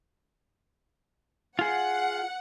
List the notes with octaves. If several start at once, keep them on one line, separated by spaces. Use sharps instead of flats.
F4 G#4 F#5